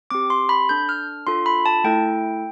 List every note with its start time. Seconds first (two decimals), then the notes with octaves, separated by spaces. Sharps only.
0.10 C4 G4 D6
0.30 C6
0.49 B5
0.69 D4 A4 G6
0.89 F6
1.27 D4 F4 A4 C6
1.46 B5
1.66 A5
1.84 A3 E4 A4 G5